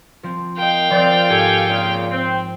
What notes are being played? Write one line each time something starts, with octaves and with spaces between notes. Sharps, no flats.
F3 C4
A#4 D#5 F5 G5
F3 C4 D5
G#2 G4 A4 G#5
A#2 C#3
C4